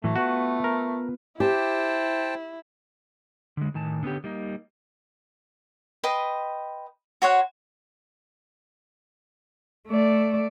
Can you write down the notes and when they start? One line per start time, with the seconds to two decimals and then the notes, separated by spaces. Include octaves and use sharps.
0.04 A2 E3 F#3 A3
0.16 B3 F4 F#4 B4
0.64 A#4
1.40 E4 G4 C5 G5 A5
3.57 D3 G#3
3.74 A2 D#3 G#5 A5
4.03 D3 B3 C#4 G4
4.24 G3 A#3 D#4
6.04 B4 D#5 G5 C6
7.22 F#4 C5 C#5 F#5
9.88 A3 D5